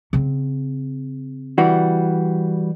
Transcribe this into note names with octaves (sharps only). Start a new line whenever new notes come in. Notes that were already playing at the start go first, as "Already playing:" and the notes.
C#3 C4
E3 G3 F#4